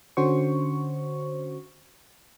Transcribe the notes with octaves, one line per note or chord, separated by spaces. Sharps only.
D3 C#4 F#4 C5 C#6